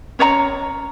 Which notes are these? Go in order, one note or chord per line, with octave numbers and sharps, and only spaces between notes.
C#4 C#5 D5 A#5